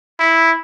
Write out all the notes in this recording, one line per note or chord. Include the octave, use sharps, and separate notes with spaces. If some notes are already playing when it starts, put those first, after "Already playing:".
E4